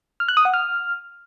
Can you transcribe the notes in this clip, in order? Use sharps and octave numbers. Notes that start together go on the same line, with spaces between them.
F6
F#6
D#6
F#5
F6